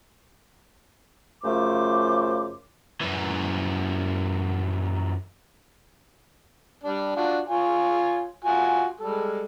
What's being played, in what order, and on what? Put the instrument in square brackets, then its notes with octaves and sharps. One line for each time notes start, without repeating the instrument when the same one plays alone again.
[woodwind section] F#2 C#3 F3 A3 C5 D6
[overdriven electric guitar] F#2 E3
[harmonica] G3 D4
D4 F4 F#4
F4 C#5 G#5
F4 F#4 G#5
G3 G#3 A4